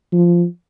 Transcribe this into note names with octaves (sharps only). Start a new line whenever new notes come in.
F3